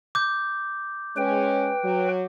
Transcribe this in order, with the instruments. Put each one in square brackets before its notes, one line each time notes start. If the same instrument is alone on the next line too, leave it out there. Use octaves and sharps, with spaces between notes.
[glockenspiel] D6 G6
[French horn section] G#3 C#4 [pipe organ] B4 G5
[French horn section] F#3